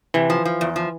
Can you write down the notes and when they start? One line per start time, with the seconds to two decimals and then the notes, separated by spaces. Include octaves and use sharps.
0.14 C3 E3
0.30 F3
0.45 F3
0.61 E2
0.76 F3